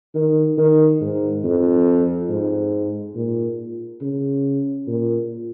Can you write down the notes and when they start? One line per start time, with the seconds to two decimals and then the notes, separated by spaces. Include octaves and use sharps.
0.15 D#3
0.58 D#3
1.01 G#2
1.44 F2
2.29 G#2
3.15 A#2
4.01 C#3
4.87 A#2